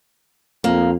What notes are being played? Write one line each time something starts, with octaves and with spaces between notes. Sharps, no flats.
F2 A#3